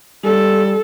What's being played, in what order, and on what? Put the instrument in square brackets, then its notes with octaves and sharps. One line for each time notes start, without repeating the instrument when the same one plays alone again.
[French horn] G3 [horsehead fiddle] A4